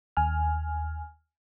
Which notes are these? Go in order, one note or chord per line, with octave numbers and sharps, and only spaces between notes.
D#2 G#5 F6